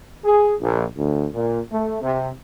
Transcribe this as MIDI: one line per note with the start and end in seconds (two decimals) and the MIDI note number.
0.24 0.54 68
0.60 0.84 34
0.96 1.27 38
1.33 1.60 46
1.72 1.98 57
2.01 2.30 48